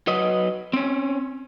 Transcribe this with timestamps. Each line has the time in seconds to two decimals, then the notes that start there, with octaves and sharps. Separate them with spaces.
0.07 F#3 B4 D#5
0.73 C4 C#4